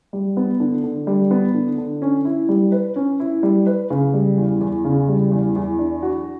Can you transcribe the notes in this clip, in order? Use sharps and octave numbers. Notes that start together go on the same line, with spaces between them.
G3
B3
D3
D3
G3
B3
D3
D3
C#4
E4
G3
B4
C#4
E4
G3
B4
C#3
G3
E2
E2
C#3
G3
E2
E2
D4
F#4